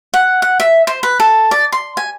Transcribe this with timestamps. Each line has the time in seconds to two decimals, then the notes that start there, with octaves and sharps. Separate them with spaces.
0.14 F#5
0.42 F#5
0.60 E5
0.87 C5
1.03 B4
1.20 A4
1.51 D5
1.72 C6
1.97 G#5